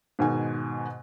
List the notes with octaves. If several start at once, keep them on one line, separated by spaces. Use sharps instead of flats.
G#2 B2 D#3 G#5